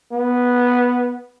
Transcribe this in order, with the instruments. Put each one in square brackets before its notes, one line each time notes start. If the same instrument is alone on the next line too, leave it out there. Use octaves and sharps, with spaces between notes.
[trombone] B3